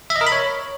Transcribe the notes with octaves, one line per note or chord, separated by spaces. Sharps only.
E5
D#5
A#4
B5
C#5